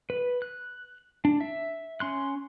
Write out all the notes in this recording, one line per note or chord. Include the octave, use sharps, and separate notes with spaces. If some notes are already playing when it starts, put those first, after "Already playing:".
B4
F#6
D4
E5
C#4 C6 F#6